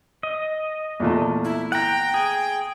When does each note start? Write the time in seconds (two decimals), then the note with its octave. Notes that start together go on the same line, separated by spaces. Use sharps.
0.23 D#5
1.00 E2 A#2 A3
1.45 E4
1.72 F#5 G5 A#5
2.14 G#4